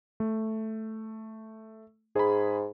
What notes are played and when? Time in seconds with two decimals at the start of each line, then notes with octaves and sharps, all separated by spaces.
0.20 A3
2.16 G#2 G#4 B5